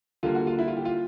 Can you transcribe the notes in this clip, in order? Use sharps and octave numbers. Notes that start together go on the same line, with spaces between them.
D3 G3 A#3 F4
F#4
F4
E4
F4
G4
F4